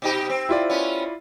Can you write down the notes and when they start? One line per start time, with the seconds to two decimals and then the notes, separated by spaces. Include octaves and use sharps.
0.02 B2 D#4 G4
0.29 C4
0.49 E4 F4 D5
0.69 B3 C#4